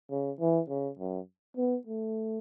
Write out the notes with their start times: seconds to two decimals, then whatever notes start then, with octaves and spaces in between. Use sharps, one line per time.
0.11 C#3
0.40 E3
0.69 C#3
0.99 F#2
1.57 B3
1.87 A3